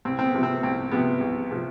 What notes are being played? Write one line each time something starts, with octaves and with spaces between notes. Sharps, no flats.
C2 C4
C4
B3
C3 F3
C4
C2 C4
C3 F3 B3
C2
C3 F3